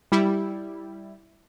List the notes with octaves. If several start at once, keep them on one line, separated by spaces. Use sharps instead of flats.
G3 E4